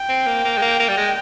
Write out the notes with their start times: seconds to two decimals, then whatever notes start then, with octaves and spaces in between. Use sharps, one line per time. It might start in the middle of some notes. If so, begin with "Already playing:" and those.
Already playing: G5
0.09 C4
0.27 A#3
0.45 A#3
0.58 G#3
0.62 A#3
0.79 A#3
0.89 G3
0.97 G#3